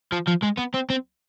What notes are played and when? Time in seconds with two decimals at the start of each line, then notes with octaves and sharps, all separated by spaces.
0.12 F3
0.28 F3
0.43 G#3
0.59 B3
0.74 C4
0.90 C4